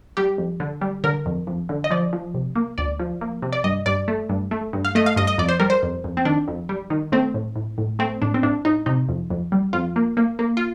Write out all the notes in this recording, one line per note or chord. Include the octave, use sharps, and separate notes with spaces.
G3 G4
F2
D3
G3
D3 A#4
F2
F2
D3
D#5
F3 D5
F3
C3
A#3
D2 D5
F3
A#3
C3
D5
G2 D#5
G2 D5
A3
G2
A3
G2
F5
A3 D#5
F5
G2 D#5
D#5
F2 D5
C5
G3 A#4
C5
F2
F2
C4
D#3 D4
F2
G3
D#3
A3 C4
A2
A2
A2
A3 C4
A2 D4
C4
A2 D4
A2 D#4
C3 D#4
F2
F2
G3
F2 F4
A#3
A#3
A#3
F4